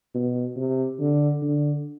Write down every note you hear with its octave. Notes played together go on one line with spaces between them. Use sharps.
B2
C3
D3
D3